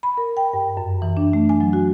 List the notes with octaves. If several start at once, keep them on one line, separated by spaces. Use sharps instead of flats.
B5
A#4
G5
G2
F#2
E3
D4
A3
G#5
F#3
F#4